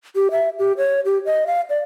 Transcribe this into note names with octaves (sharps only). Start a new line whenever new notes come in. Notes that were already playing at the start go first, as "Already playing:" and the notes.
G4
E5
G4
C#5
G4
D#5
F5
D5